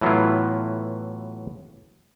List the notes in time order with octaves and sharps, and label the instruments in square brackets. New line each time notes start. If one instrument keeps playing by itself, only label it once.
[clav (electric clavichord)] A2 E3 F#3 B3 E4 F4